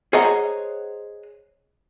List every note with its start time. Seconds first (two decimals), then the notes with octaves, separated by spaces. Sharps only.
0.13 G#4 C5 C#5 D#5 F#5 A#5